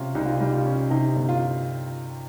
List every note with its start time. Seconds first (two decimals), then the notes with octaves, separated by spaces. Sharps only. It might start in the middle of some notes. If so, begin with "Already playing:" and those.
Already playing: C3 G3 C#4 F4
0.15 C2 D#4
0.25 F4
0.37 G3 D#4
0.53 F4
0.65 C#4
0.90 C3 D#4
1.15 G1
1.29 F4